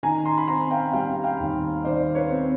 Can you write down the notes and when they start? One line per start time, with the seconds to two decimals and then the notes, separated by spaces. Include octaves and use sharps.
0.03 D#3 G#5 A#5
0.25 A#5 C6
0.38 B5
0.48 C4 A#5 C6
0.71 F5 G5
0.93 G3 F5 G5
1.24 F5 G5
1.40 D#2
1.84 D#3 C5 D5
2.15 B4 C#5
2.30 C4